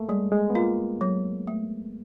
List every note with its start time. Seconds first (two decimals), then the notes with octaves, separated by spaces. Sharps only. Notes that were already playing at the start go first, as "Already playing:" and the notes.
Already playing: A3 A#3
0.09 G3 G#3
0.32 G#3
0.50 B3
0.55 A#3 F4
1.01 F#3
1.47 A3